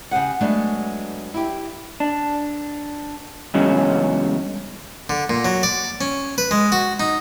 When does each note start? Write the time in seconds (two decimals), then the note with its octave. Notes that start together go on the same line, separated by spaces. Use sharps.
0.11 C#3 G4 G#4 F#5
0.41 F#3 G#3 A3 B3 D4
1.34 E4 G4
2.00 D4
3.54 E2 G2 C#3 F#3 G#3 C#4
5.09 D3
5.29 A#2
5.45 F#3
5.63 D5
6.01 C#4
6.38 B4
6.51 G#3
6.72 F#4
7.00 D#4